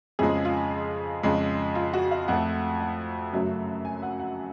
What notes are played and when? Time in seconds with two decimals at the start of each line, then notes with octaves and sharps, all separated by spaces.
0.19 F2 C#3 F3 G#3 G#4
0.45 F4
1.23 F2 C#3 G#3
1.75 F4
1.94 F#4
2.11 F5
2.28 F2 F3 A3 F#5
2.81 F#5
3.33 F#2 C#3 F#3 A3
3.85 G#5
4.03 F#5
4.20 F#5